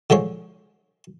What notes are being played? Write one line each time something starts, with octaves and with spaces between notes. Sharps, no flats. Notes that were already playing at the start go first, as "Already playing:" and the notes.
D3 F3 G#3 C#5